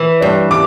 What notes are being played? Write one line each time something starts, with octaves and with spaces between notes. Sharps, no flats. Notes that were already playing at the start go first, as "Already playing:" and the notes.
Already playing: E3
G2
D6